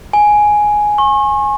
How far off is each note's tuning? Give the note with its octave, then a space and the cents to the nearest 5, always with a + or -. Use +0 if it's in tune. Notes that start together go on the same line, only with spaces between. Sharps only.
G#5 +5
C#6 -40